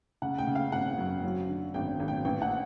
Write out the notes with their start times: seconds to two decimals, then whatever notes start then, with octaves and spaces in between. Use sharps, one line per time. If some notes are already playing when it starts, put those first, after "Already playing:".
0.22 C#3 F#5
0.38 G5
0.47 C#3
0.55 F5
0.72 G#1 F#5
0.98 F#2
1.23 F#3
1.49 D3
1.74 G#1 G5
2.00 G#1
2.08 G5
2.25 A1 G5
2.42 F#5